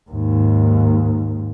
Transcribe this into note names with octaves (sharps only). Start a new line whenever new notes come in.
D#2 G#2